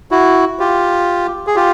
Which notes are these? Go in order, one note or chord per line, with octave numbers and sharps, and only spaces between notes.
E4 F#4
F4 G4
G#4
F4 G4